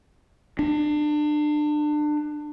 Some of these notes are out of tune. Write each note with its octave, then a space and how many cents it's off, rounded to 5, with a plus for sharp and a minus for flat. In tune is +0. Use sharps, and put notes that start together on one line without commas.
D4 +30